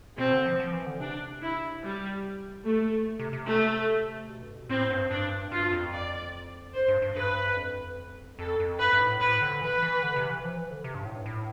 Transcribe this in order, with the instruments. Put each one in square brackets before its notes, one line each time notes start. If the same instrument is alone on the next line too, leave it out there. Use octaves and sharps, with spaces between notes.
[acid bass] B2 [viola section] C4
[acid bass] D3
F3
F3
E3
D3
[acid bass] C3 [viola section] D4
[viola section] E4
G3
[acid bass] B2 [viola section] A3
[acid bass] A2
G2
A2
C3
C3
[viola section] A3
[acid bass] B2
G2
B2
[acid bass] A2 [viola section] C4
[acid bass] G2
[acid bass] G2 [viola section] D4
[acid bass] G2 [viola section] F4
[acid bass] F2
[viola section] D5
[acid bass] G2 [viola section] C5
[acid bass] G2
G2
[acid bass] G2 [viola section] B4
[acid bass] F2
[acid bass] F2 [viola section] A4
[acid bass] F2
[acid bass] G2 [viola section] B4
[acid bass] G2
A2
[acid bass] A2 [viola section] B4
[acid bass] D3
[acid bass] E3 [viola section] B4
[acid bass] E3
D3
C3
E3
F3
E3
D3
C3
G2
A2
G2
A2